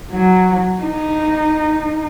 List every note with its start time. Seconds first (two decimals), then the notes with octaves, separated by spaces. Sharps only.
0.12 F#3
0.82 D#4